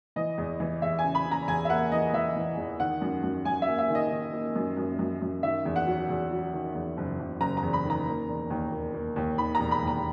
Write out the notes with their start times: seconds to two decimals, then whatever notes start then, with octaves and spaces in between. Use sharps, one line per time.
0.16 E3 D#5
0.38 E2
0.60 E3
0.82 E2 E5
0.99 G#5
1.04 C#3
1.15 B5
1.26 C#3
1.31 A#5
1.48 E2 G#5
1.65 E5
1.70 A#3 F#5
1.92 E3 D#5
2.13 E3 E5
2.36 E3
2.58 E2
2.80 D#3 F#5
3.01 F#2
3.23 F#2
3.45 F#2 G#5
3.62 E5
3.67 A#3
3.78 E5
3.89 D#3
3.95 D#5
4.11 D#3
4.33 A#3
4.55 F#2
4.77 F#2
4.99 F#2
5.22 F#2
5.43 D#3 E5
5.65 E2
5.76 F#5
5.87 F#3
6.09 E2
6.31 F#3
6.53 D#3
6.75 E2
6.97 F#1
7.19 F#1
7.40 F#1 A#5
7.57 A#5
7.63 E2
7.73 B5
7.85 D#3
7.90 A#5
8.07 A#3
8.28 E1
8.50 D#2
8.72 A#3
8.94 A#3
9.16 D#2
9.38 D#3 B5
9.55 A#5
9.60 E1
9.71 B5
9.82 D#2
9.87 A#5